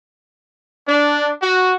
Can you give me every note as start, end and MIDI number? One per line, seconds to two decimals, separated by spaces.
0.87 1.29 62
1.42 1.74 66